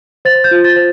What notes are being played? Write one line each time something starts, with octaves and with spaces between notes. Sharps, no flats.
C5 A6
G6
F4
A6
C5